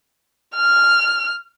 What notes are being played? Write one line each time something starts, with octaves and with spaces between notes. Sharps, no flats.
F6